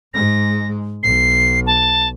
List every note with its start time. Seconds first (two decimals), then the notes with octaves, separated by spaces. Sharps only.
0.14 G#2 G#3 A#6
1.03 B1 C7
1.66 A5